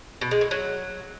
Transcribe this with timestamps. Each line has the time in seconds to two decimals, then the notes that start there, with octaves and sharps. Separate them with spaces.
0.21 B2
0.31 G#3
0.41 A2
0.51 F#3